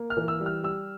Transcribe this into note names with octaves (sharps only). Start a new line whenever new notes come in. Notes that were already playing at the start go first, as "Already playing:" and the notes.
Already playing: A#3
F6
E3
E6
G3
F6
G3 E6